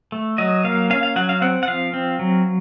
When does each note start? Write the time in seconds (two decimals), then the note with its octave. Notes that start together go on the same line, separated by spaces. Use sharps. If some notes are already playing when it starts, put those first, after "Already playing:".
0.12 A3
0.38 F#3 D#5
0.64 A#3 F5
0.90 C#4 F5
1.03 F5
1.16 F#3 F#5
1.29 F5
1.42 C4 F#5
1.63 F#5
1.68 F3 F5
1.94 C4
2.19 F#3